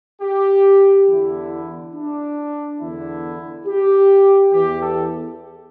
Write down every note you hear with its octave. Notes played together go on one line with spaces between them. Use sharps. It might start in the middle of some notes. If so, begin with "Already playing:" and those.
G4
E2 D3 E4
D4
E2 D3 E4
G4
E2 E3 G4
A4